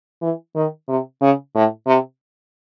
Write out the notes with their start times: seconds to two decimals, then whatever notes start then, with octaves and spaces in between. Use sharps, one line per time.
0.22 E3
0.55 D#3
0.88 C3
1.21 C#3
1.55 A2
1.87 C3